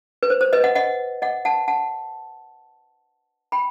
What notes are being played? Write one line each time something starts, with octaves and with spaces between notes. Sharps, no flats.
B4
C5
C5
B4 D#5
D#5 F#5
D#5 F#5
D#5 F#5
F#5 A5
F#5 A5
G5 B5